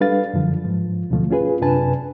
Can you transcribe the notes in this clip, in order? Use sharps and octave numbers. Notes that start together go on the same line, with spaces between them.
G3 D4 A4 B4 F5 A6
F#2 D3 F3
G#2 F3
D2 B2 D3 F3 A3
C#4 F4 G#4 B4
F#2 C3 D4 B4 G#5 A5